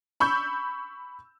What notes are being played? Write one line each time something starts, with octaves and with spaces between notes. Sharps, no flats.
B5 C#6 E6 G6